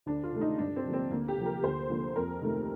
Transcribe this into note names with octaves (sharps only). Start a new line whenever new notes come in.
D2 D4
F4
C3 D#3 A3
D#4
G2 D4
C4
D3 F3 A#3
C4
D2 A#3
G4
C3 F3
A#4
D2 C5
D3 F3 A#3
F2 A#4
C3 D#3 A3